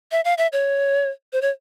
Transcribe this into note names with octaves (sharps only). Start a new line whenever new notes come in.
E5
F5
E5
C#5
C5
C#5